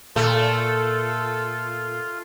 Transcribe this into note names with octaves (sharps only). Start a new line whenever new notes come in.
A#2 A3 F4 A4